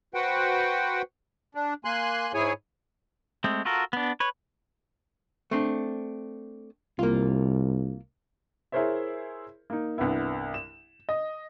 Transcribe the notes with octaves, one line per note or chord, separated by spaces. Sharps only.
F#4 B4 C5 F#5 G5
D4
A#3 G#5 C6 F#6
G#2 E4 G#4 C#5 G#5
G#3 A3 C4
F4 F#4 A4 A#4
B3 D4
B4 C#5
A3 C4 D4
C2 A#3 F4
E4 G#4 A#4 C5 C#5 E5
A#3 D#4
C2 G2 B3 E4
E7
D#5